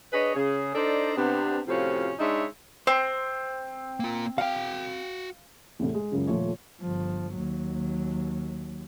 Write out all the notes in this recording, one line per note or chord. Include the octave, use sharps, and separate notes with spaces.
D4 G#4 B4 C#5 D#5
C#3 G#4
D4 D#4 A4 C5 D5 D#5
C3 B3 D4
A2 C3 F3 C#4 F4 F#4
G#3 D4 D#4 C#5 E5
C4 C5
A#3 F4
F#4 F5 G5
E2 A2 C3 A3
G#3
C#2 F#2 C#3
D#1 F3 A3 C#5
G1 F3
D#2 F#3